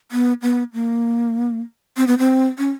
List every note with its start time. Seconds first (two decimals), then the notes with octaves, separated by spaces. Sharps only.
0.11 B3
0.42 B3
0.73 A#3
1.97 C4
2.07 B3
2.18 C4
2.58 C#4